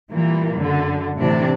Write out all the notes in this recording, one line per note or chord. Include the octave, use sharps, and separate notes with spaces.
A#2 E3 G3 A#3
F#2 D3
A2 C3 E3 D4